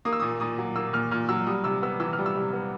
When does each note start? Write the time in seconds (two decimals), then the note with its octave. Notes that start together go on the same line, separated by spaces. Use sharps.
0.05 A#3 D#6
0.13 E6
0.20 A#2 D#6
0.40 A#2 D#6
0.58 F#3
0.76 A#3 E6
0.93 A#2 F6
1.11 A#2 F6
1.29 F#3 E6
1.47 G3 D#6
1.64 C3 E6
1.82 B3 E6
2.00 E3 E6
2.13 F6
2.19 G3
2.26 E6
2.36 C3
2.53 B3